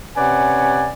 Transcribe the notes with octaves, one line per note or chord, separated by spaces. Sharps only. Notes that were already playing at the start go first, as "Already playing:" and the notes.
C3 C#4 B4 D5 F#5 G#5